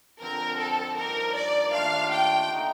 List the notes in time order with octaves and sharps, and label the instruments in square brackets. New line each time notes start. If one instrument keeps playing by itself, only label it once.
[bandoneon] F2 D3 F3 C4 [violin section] A#4
[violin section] A4
[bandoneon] G2 F3 A#3 D#4 [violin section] A#4
[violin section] D5
[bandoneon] D#2 D#3 A3 D4 F4 [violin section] F5
[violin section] G5
[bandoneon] D3 A3 D#4